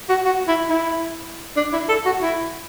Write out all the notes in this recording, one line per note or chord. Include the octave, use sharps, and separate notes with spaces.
F#4
F#4
E4
E4
D4
E4
A4
F#4
E4